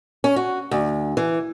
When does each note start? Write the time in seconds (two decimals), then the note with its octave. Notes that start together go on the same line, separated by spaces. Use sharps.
0.24 C#4
0.36 F#4
0.71 D2
1.17 E3